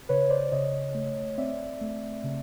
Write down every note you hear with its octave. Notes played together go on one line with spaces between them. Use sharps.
C#3 B4 C#5
C5 D5
C#3 C#5 D#5
A3
C4 D5 E5
A3
C#3